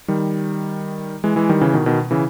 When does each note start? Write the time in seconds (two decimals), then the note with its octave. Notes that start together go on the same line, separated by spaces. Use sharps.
0.08 D#3 G3
1.24 E3 G#3
1.36 E3 G#3
1.49 D#3 G3
1.61 C#3 E3
1.74 B2 D#3
1.86 B2 D#3
2.11 C#3 E3